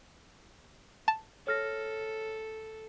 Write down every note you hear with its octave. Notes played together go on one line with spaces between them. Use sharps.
A5
A4 C#5 F6 A#6